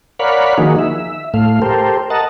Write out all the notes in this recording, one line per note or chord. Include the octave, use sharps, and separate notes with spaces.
A#4 C#5 D5 F5 F#5 B5
D#3 F3 A#3 D#4 F#4 G#4
E5
A2 A3 F5
G4 A4 A#4 C5
A#4 D#5 F#5 A5